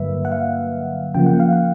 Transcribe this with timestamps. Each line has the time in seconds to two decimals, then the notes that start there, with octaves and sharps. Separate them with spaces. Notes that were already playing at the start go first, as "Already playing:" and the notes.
Already playing: G2 D3 F#3 A#3 B4 E5
0.25 F#5
0.32 F5
1.15 C#3 F3 A#3 G5
1.26 F#5
1.40 F5
1.53 F#5